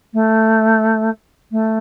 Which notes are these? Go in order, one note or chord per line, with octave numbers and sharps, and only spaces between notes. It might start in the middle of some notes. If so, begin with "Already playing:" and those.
A3
A3